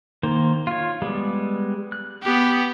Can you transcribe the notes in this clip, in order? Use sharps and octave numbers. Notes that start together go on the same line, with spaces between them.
D#3 A#3 C5
F4 C#5
G3 G#3 B3
F#6
B3 G4